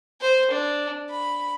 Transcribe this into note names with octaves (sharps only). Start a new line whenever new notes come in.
C5
D4
B5